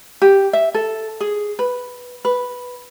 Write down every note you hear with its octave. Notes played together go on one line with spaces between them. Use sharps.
G4
E5
A4
G#4
B4
B4